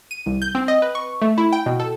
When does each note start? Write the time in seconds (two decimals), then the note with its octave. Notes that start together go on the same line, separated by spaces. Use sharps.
0.11 D#7
0.26 C2
0.42 G6
0.55 C4
0.68 D#5
0.82 B4
0.95 C#6
1.22 A3
1.38 E4
1.53 G5
1.66 B2
1.80 A4